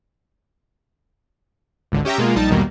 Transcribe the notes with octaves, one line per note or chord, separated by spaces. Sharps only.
G#1 C#2 D3
C#4 G4 E5 G5 A#5
B2 G#3 A#3 F4
A#1 G3 D#4 A5
B1 E2 B2 D#3 G3 A#3